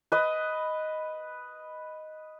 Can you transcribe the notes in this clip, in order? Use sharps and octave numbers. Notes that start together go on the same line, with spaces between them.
B4 D#5